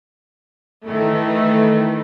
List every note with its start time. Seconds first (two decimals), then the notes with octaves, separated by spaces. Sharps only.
0.87 D#3 E3 A3